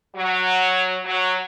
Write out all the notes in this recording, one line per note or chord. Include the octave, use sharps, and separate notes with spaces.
F#3
F#3